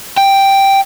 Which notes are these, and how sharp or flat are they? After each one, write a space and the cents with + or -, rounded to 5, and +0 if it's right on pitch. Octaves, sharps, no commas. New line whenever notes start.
G5 +0